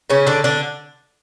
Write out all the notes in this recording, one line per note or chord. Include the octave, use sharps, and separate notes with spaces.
C#3 C#4
D3 D4
D3 D4